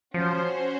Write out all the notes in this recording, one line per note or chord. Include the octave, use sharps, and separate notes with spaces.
F3 C#4 F#4 C5